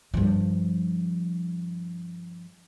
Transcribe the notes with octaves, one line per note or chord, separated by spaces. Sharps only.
G2 F3